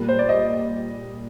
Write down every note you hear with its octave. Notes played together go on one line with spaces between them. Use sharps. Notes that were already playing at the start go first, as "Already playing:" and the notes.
Already playing: A#2 G3 A#3
C5
D5
D#5